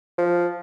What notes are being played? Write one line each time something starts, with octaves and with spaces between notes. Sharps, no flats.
F3